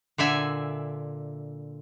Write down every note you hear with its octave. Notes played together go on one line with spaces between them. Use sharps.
A#2 D3 E5 G#5